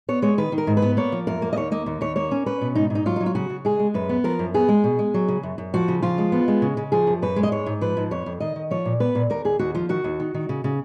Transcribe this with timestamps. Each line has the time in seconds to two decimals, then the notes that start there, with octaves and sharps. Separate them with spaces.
0.09 B3 C#5
0.22 G#3 C#5
0.38 D#3 B4
0.52 D#3
0.58 A#4
0.67 G#2
0.77 B4
0.82 B3
0.97 A#3 C#5
1.12 F3
1.27 F#2 A#4
1.42 A#3
1.53 D#5
1.56 D#2 C#5
1.72 A#3 D#5
1.86 D#2
2.01 D#2 C#5
2.16 A#3 C#5
2.31 C#4
2.46 C#4 B4
2.61 B2
2.75 G#2 D#4
2.90 G#2
2.95 D#4
3.06 F#3 F4
3.16 F#3 D#4
3.26 F4
3.35 C#3 F#4
3.50 C#3
3.65 G#3 G#4
3.79 G#3
3.94 F#2 B4
4.09 B3
4.24 F3 A#4
4.39 F#2
4.54 B3 G#4
4.69 G#3
4.84 B2
4.99 G#3
5.14 F#3
5.28 C#3
5.43 F#2
5.58 F#2
5.74 F3 F#4
5.88 C#3
6.02 F3 F4
6.18 G#3
6.32 B3
6.48 G#3
6.62 C#3
6.77 C#3
6.92 F3 G#4
7.07 F#2
7.22 F#2 B4
7.36 G#3
7.43 D#5
7.52 G#2 C#5
7.66 G#2
7.81 F3 B4
7.97 G#2
8.11 F2 C#5
8.26 F2
8.40 D#3 D#5
8.56 D#3
8.71 F3 C#5
8.85 A#2
9.00 B3 B4
9.15 A#2
9.30 D#2 A#4
9.45 D#2 G#4
9.59 D#2 F#4
9.75 F3 F4
9.89 D#3 F#4
10.04 D#2
10.20 D#3
10.34 D#3
10.49 C#3
10.64 C#3